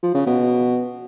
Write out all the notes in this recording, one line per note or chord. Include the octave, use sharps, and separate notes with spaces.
F3
C#3
B2